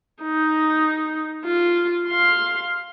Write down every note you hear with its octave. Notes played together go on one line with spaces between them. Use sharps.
D#4
F4
F5 C6